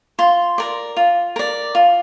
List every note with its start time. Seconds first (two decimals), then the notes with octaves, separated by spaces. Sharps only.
0.19 F4 C6
0.58 A#4 D5
0.97 F4
1.36 A#4 D5
1.75 F4